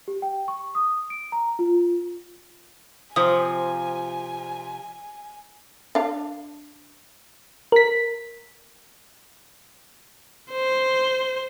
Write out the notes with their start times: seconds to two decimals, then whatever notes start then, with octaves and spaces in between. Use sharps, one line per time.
0.08 G4
0.22 G5
0.48 C#6
0.75 D#6
1.10 D7
1.32 A#5
1.59 F4
3.16 C3 F3 C5 G#5 D#6
5.95 D4 F5
7.72 A#4 B6
10.52 C5